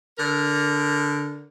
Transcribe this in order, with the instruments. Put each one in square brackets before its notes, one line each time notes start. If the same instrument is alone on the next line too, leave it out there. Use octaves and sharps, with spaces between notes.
[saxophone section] D3 A#4